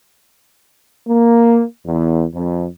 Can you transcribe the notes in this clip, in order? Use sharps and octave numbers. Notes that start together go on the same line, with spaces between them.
A#3
E2
F2